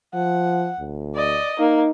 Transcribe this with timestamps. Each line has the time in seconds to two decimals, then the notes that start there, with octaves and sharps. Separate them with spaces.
0.14 F3 F#5
0.79 D2
1.15 D5 D#5
1.59 A#3 D#4